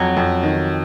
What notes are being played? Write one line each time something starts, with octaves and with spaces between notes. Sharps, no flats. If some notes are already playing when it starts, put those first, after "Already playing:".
Already playing: F2 F#3
F2
D#3